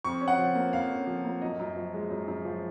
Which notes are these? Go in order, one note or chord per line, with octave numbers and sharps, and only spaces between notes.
F2 C#6
C#4
F#5
F3
A#3
F2 F5
C#4
F3
A#3
F#2 D#5
F#2
F3
G#3
F#2
F#2
F3